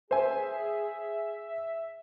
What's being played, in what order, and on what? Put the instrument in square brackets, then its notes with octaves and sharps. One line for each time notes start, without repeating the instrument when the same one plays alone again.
[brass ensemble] G#4 [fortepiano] C5 G#5 [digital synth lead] E5